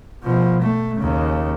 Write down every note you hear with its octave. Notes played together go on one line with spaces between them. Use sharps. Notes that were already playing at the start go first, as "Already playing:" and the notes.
B2 F3
A3
D#2 C#3